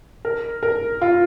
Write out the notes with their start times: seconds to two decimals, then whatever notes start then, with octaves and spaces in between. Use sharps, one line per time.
0.25 A#4
0.63 A#4
1.01 F4